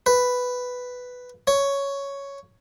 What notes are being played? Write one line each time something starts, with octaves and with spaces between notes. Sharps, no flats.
B4
C#5